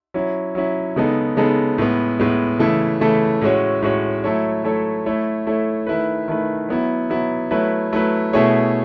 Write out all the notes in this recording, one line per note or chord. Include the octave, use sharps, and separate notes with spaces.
F#3 C#4 E4
F#3 C#4 E4
C#3 G#3 B3 D#4 A4
C#3 G#3 B3 D#4 A4
A2 G#3 B3
A2 G#3 B3
C#3 E3 A3 E4 A4
C#3 E3 A3 E4 A4
A2 G#3 C#4 F#4 C#5
A2 G#3 C#4 F#4 C#5
F#3 A3 E4 A4 C#5
F#3 A3 E4 A4 C#5
A3 E4 A4 C#5
A3 E4 A4 C#5
D#3 A3 E4 B4
D#3 A3 E4 B4
F#3 B3 E4
F#3 B3 E4
F#3 A3 E4 B4
F#3 A3 E4 B4
B2 A3 E4 G#4 C#5